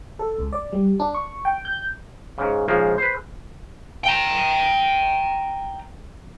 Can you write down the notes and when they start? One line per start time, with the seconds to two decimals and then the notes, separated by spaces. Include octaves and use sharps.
0.19 A4
0.39 C#2
0.53 D5
0.73 G3
1.00 D4
1.14 C#6
1.45 G5
1.65 G6
2.38 G#2 C#3
2.68 A#1 G#2 C#3 F3 G#3
2.98 B4 C5
4.04 G5 A#5